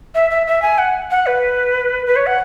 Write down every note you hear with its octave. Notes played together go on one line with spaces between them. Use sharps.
E5
E5
E5
G#5
F#5
F#5
B4
B4
C#5
F#5